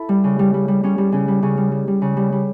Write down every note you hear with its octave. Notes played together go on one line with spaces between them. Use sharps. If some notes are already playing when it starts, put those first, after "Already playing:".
Already playing: E4 A4
G3
C#3
G3
G3
G3
G3 C#4
G3
C#3 C#4
G3
C#3 C#4
G3
G3
G3
C#3
G3
G3